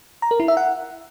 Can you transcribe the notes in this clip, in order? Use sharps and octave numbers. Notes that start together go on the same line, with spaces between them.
A#5
A#4
E4
E5
F#5